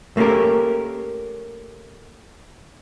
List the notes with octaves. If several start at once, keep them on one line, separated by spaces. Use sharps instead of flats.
A3 A#3 C#4 G4 A#4